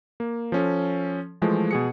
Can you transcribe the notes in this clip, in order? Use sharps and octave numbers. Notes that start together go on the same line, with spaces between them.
A#3
F3 C#4 A4
E3 F3 G#3 A3
B2 G#4 C#7